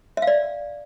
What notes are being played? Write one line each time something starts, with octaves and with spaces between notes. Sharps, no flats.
E5
F5
D5